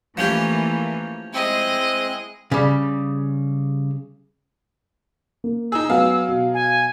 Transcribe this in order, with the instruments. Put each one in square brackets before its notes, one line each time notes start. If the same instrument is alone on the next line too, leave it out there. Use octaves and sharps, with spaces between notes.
[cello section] E3 A3 A#3 [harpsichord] F3 C#4 G4
[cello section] G#3 [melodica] C4 [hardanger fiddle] E4 D#5
[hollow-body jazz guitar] C#3 G3
[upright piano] A#3
[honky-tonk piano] D#4 G#4 [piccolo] E6
[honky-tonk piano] F#3 G#4 F5 [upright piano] B3
[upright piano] B2
[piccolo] G#5